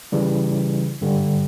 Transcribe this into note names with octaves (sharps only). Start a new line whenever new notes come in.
C#3 E3 G3
G2 D3 G3